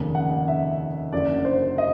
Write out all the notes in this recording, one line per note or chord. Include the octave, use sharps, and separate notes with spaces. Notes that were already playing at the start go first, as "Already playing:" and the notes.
Already playing: F1 D#2 C#3
F#5
E5
F#1 F#2 D3 D5
C5
D#5